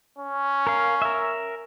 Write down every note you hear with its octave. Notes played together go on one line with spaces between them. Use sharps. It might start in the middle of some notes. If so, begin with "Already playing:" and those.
C#4
A#4 F5
A#4 E5